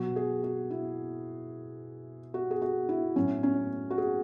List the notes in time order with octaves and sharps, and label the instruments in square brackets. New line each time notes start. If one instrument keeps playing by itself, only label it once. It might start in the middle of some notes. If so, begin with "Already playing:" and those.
Already playing: [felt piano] B2 F#3 F#4
G#4
F#4
E4
F#4
G#4
F#4
E4
A2 F#3 C#4
C#4
F#4
G#4